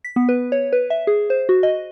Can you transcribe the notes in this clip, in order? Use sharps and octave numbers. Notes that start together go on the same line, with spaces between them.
B6
B3
B4
C#5
B4
E5
G#4
C5
F#4
D#5